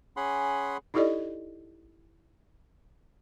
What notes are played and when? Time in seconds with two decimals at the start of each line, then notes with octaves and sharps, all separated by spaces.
0.17 C#4 G#4 F#5 B5 C6
0.94 D#4 E4 G4 A4 D5 D#5